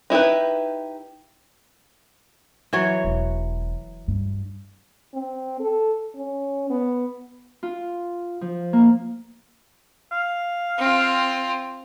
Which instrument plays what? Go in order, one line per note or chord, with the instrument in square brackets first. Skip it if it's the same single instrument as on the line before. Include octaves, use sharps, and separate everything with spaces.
[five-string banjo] D#4 E4 G4 B4
[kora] E3 F#3 C#5
[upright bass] E1
G2
[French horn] C4
A4
C#4
B3
[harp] F4
F3
A#3
[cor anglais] F5
[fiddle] C4 F4